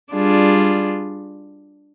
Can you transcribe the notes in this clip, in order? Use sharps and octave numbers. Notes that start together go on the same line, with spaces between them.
G3 D4 F4 G#4